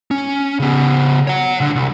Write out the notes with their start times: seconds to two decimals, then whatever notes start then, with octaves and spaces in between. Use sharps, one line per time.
0.11 C#4
0.60 C#3 B3
1.27 C#5 F#5
1.60 C#2 D3
1.75 C2